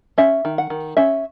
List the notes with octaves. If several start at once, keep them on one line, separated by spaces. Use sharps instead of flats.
C#4 E5
D#3
F#5
D#3
C#4 E5